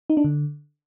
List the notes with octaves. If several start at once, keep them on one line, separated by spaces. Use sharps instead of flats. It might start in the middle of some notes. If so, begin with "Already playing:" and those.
D#4
D4
D3